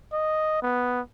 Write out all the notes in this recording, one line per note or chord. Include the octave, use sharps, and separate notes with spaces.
D#5
B3